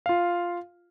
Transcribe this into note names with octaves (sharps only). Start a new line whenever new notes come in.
F4 F5